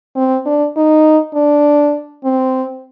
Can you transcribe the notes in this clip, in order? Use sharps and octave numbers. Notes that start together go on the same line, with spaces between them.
C4
D4
D#4
D4
C4